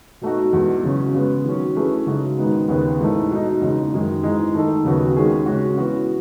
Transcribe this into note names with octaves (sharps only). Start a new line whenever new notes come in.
B2 A3 D#4 F#4
E2 B2 G#3
E2 C#3 F#3 C#4
C#3 G#3 B3
D#3 F#3 C#4
E3 A3 C#4 G#4 B4
C#3 G#3 D#4 F#4
G#2 D#3 G#3 B3 D#4
D#2 C#3 G#3 B3
G#2 E3 A3
B2 G#3 D#4
E2 C#3 G#3 D#4
F#2 D#3 G#3
G#2 E3 G#3 D#4
D#3 A3 D#4 A4
D#2 C#3 F#3 B3 F#4
D#3 G#3 C#4 G#4
C#3 G#3 C#4 F#4
E3 B3 F#4